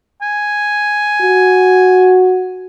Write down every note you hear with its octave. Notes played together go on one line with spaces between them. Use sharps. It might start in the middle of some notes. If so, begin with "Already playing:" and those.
G#5
F#4